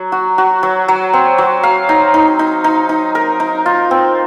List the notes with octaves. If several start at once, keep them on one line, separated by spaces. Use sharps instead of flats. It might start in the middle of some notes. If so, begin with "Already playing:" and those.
Already playing: F#3
F#4
F#4
F#3
F#3
C4
F#3
F5
D#4
D#4
D#4
D#4
D#4
A#4
D#4
F4
C4